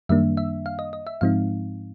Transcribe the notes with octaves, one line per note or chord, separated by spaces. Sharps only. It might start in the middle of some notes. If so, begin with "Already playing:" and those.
F#2 D#3 G3 A#3 D4 E5
E5
F5
D#5
D#5
E5
G#2 F3 G#3 C4 D#4 F5